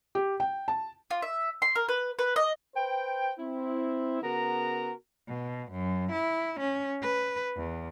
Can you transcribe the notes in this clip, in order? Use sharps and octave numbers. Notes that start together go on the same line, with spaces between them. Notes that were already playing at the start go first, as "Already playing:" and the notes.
G4
G5
A5
F4
E5
C6
A#4
B4
B4
D#5
B4 C5 G5
C4 E4
C#3 B3 F#4 A#4 A#5
B2
F#2
E4
C#4
B4
E2